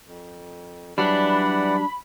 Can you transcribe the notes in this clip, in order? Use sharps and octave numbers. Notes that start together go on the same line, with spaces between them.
F2
E3 F#3 G3 D4 D5 F#5 B5